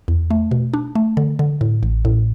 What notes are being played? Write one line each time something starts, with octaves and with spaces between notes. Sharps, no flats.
E2
A3
B2
D4
A3
D3
D3
A2
A1
A2